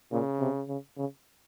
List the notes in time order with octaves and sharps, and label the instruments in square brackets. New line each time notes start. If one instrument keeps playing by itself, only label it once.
[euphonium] A#2 [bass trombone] C#3
[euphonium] C3
C#3
C#3